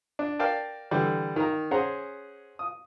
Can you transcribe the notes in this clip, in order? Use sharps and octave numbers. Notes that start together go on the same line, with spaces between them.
D4
A#4 D5 F5 G5 A5
D3 E3 G3
D#3 A#5
C#4 G#4 C5 F#5 A#5
D#6